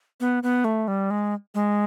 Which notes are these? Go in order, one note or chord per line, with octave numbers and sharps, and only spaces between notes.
B3
B3
A3
G3
G#3
G#3